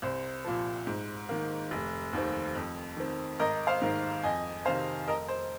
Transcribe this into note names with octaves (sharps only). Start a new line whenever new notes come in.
C2 C5
A#2 F3
G#2
D#3 A#3
F1
D#2 D#3 C4
F2
D#3 C4
G#1 A#4 D#5
C5 F5
G#2 D#3 A#3
F2 D#5 G#5
C3 D#3 C4 C5 F5
F1 A#4 D#5
C5